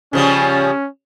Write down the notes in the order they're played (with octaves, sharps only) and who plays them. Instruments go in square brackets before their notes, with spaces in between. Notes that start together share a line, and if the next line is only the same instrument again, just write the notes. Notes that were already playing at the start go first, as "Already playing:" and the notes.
[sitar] C#3 F3 G3 [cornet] C#4